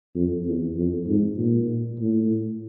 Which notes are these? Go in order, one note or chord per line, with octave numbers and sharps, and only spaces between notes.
F2
E2
F2
G#2
A#2
A2